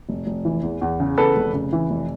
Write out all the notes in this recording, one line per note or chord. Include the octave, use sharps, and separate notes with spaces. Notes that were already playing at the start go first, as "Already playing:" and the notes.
F1
F1
E3
E2
E2
C#3
E2 A4 B4
F1
C#3
E3
F1